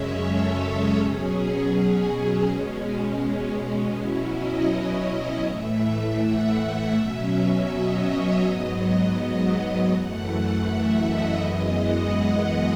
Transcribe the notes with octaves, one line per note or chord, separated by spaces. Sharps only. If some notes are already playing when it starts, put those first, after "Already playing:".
Already playing: F#2 C#3 G#3 C#4 C#5 E5
A4
B2 F#3 C#4 G#4
B2 G#3 C#4
B2 F#3 C#4 E4
D#5
D#5
A2 E3 A3 E5
F#5
E5
B2 F#3 C#4
D#5
C#5
G#2 F#3 B3 D#5
F#2 E3 A3 F#5
E5
D#5
F#2 E3 G#3 B3 D#5
F#5
F#5